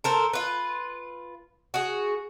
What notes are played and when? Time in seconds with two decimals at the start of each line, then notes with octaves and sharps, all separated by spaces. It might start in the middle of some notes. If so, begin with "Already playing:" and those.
0.04 A4 A#4 C5
0.33 F4 B4
1.74 F#4 G#4